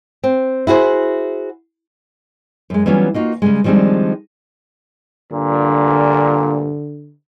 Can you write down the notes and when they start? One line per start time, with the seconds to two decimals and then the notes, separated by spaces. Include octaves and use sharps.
0.23 C4
0.67 E4 F#4 G#4 C5
2.70 F#2 G#3
2.86 E3 F#3 G3 B3 C#4 F4
3.14 A#3 D#4 F4 F#4
3.42 C#3 G3 G#3
3.64 D#3 F3 G3 G#3 C4 D4
5.31 G2 A#2 D3